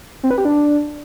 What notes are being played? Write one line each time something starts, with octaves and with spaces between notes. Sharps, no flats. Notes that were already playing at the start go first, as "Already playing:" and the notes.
C4
B4
G4
D4